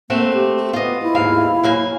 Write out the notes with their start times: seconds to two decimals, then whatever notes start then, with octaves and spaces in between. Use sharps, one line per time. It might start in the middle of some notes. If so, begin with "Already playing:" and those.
0.10 A3 A#3 C4 F#4
0.34 G4
0.73 B3 F4 D#5
1.02 E4
1.15 D#2 G#2 F5
1.63 F#3 A#3 G#5